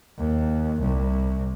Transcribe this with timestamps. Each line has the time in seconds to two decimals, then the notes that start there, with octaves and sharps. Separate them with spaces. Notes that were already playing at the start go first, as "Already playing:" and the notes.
0.19 D#2
0.81 C2